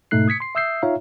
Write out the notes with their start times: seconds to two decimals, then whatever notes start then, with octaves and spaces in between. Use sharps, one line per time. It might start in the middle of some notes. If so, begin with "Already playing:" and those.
0.11 G#2 B2 A3 D#4 F#6 C7
0.28 D#6 G#6 B6 C#7
0.40 C6 C7
0.55 E5 D#6 E6 G6 C7
0.83 D#4 F4 C#5 E5 F5 A#5